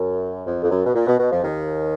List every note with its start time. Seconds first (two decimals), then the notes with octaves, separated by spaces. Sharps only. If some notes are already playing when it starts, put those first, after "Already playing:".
Already playing: F#2
0.46 F2
0.63 F2
0.70 F#2
0.86 B2
0.94 A#2
1.07 B2
1.19 B2
1.31 F2 F3
1.43 D#2 D#3